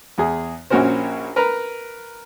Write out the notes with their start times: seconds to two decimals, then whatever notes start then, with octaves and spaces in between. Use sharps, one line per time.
0.18 E2 G#4
0.70 A#1 A#2 C#4 F#4 A#4 C5
1.36 A#4 B4 A#5